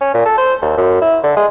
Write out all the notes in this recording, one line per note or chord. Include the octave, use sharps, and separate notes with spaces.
C#4
A#2
A4
C5
D#2
F#2
E4
D3
G#3